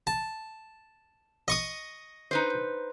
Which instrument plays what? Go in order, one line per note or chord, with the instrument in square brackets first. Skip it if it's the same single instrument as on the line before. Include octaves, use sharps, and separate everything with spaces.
[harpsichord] A5
D#5 C#6 D#6
[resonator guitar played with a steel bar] D#4 B4 C5